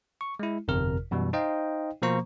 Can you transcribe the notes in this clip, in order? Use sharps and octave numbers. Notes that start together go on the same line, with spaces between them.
C#6
G#3 E4
G1 F2 C3 A#4 F6
F#2 B2 E3 G3
D#4 C5 D#5 F5 G5
B2 F3 A#3 C5 A#5 C#6